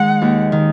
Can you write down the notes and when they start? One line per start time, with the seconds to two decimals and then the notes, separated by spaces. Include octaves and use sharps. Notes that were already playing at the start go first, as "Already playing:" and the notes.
Already playing: D#3 G#3 F#5
0.22 D#2
0.52 D#3